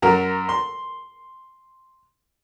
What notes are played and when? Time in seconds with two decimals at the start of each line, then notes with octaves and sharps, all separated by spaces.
0.02 F#2 F#4 A#4
0.49 C6